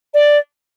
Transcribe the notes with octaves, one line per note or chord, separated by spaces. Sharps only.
D5